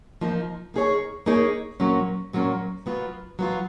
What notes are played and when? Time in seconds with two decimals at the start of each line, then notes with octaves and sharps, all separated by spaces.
0.21 F3 A#3 D#4
0.74 A#3 D#4 G#4 C#5
1.26 A#3 D#4 G#4 C#5
1.80 A#2 F#3 A#3 C#4
2.33 A#2 F#3 A#3 C#4
2.86 F#3 B3 F4
3.39 F#3 B3 F4